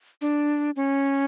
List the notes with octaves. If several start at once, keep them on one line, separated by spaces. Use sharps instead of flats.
D4
C#4